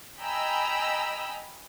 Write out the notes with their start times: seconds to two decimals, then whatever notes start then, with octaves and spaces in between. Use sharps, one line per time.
0.20 D#5 G5 G#5 A#5 B5 E6